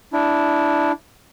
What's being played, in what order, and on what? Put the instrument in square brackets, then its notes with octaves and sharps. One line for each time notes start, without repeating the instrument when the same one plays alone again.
[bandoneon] D4 E4